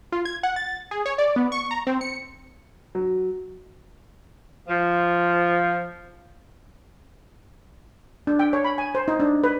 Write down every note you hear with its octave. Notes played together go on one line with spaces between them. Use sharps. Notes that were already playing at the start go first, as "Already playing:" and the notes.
F4
G#6
F#5
A6
G#4
C#5
D5
B3
C#6
A#5
C4
C#7
F#3
F3
D4
G5
C#5
B5
G#5
C5
D#4
D4
B4